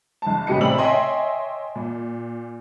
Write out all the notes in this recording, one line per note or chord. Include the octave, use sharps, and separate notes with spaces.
F#1 A5
A1 C#3 G4 D#5 C#7
A2 C3 C4 D5 E6 F#7
C#5 D#5 E5 G5 G#5 C6
A#2